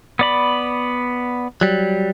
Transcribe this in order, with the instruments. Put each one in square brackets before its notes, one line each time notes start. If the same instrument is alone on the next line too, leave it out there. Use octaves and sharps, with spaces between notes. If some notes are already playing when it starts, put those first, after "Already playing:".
[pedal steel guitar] B3 D5 B5
[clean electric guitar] F#3 G3